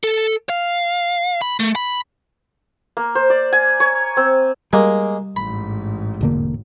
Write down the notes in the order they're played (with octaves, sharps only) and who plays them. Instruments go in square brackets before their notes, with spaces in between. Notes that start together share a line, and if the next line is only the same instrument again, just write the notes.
[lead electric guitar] A4
F5
B5
A3
B5
[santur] A#3
C5
D5
G#5
C#5
C4
[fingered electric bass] G3 [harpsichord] G#3 A#3
[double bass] A1 G#2 [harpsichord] B5
[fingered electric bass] E1 D3 A#3